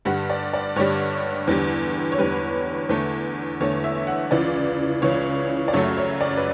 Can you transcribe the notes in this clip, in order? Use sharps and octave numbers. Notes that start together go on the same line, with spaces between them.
G2 D3 G3 F#5
D5
D5
G2 D3 G3 C#5
E2 D3 G3
C#5
E2 D3 G3 B4
E2 D3 A3
E2 D3 A3 C#5
E5
F#5
C#2 C#3 E3 D5
C#2 C#3 E3 C#5
D5
F#2 C#3 F#3 A3 C#5
C#5
D5
B4